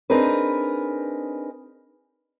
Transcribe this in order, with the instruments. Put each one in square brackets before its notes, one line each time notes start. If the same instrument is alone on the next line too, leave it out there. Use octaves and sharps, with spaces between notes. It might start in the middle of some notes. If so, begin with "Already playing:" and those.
[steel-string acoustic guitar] C4 D4 D#4 G#4 A#4 B4